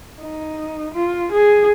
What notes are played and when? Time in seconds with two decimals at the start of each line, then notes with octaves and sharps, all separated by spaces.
0.22 D#4
0.95 F4
1.32 G#4